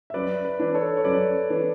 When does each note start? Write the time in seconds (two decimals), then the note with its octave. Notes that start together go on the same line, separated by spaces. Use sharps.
0.10 E5
0.14 F#2 B4 D5
0.45 B4
0.59 E3 B3 D4
0.74 A4 C#5
0.97 C#5
1.04 F#2 B4 D5
1.50 E3 B3 D4